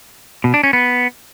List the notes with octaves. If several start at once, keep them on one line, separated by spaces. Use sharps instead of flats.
B2
D4
C#4
B3